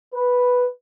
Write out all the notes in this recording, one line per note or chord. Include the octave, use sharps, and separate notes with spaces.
B4